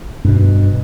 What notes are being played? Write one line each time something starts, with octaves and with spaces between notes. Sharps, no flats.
G2 B2